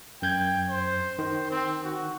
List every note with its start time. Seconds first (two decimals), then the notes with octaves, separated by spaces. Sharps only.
0.22 F#2 G5 G6 G#6
0.69 C5
1.19 D#3 C5
1.51 C4
1.84 F#4